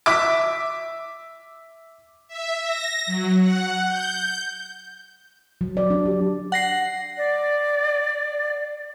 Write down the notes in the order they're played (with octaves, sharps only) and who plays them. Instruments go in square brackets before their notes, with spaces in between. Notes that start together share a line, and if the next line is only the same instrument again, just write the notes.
[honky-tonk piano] E5 D6
[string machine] E5
A#6
F#3
F#5
G6
[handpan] F#3
D5
D4
G4
[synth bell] F#5 A#6 C7
[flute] D5